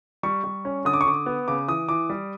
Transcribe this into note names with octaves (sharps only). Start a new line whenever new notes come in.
G3 C#6
G3
C#4
D3 D#6
D6
C#6
D3 D6
B3
C#3 D6
E3 D#6
E3 D6
G3